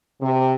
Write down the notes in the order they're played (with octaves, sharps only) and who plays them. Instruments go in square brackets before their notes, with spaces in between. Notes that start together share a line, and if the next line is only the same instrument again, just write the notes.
[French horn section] C3